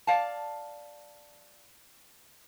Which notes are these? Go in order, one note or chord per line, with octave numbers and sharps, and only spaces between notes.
D5 F5 A5